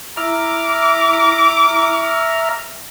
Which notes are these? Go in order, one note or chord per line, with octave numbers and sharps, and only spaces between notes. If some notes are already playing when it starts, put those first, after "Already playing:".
E4 E5 A#5 D6 F6